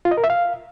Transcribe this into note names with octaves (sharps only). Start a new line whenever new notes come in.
F4
D#5
A#4
E5
F5